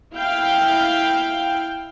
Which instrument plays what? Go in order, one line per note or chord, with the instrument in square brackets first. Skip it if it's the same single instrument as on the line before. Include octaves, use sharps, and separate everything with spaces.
[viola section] E4 F5 G5